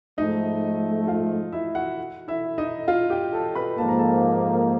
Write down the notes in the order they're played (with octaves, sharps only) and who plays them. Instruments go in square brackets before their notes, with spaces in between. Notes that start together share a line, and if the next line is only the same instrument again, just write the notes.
[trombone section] G#2 F3 A3 [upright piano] D#4 D#5
[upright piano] F4 F5
E4 E5
F#4 F#5
E4 E5
D#4 D#5
F4 F5
G4 G5
A4 A5
B4 B5
[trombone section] G#2 F3 A#3 [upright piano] A5
[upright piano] A#5
A4 A5